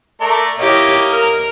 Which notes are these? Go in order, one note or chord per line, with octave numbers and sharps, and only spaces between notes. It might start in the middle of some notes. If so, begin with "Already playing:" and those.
A3 A#4 D5
A#3 E4 G4 C#5 D#5
A#4